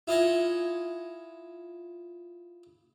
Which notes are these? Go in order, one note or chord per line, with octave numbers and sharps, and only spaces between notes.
E4 F4 D#5 F#5 G#5